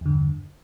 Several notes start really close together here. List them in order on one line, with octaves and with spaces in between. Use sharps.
E2 D3 G2